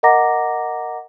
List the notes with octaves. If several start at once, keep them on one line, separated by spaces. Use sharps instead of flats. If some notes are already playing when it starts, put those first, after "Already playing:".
A#4 D#5 F#5 A#5 D6 A#6